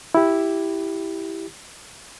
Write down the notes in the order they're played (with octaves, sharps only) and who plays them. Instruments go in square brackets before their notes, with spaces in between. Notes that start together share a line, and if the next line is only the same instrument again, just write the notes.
[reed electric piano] E4 G4